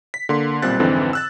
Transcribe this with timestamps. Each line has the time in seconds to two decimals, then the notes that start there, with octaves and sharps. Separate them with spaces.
0.14 B6
0.29 D3 A#3 C6
0.62 B1 A#2 G3 C4 F#6 A6
0.80 F2 G#2 D3 E3 C4
1.13 E6 F#6 A6